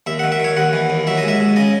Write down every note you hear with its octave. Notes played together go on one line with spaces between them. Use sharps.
D#2 E5
F#5
D#3
E5
D#3 C#5
D#2 F#5
E3
D#2
F#3 E5
D#5
G#2 E5
G#2
C#3 D#5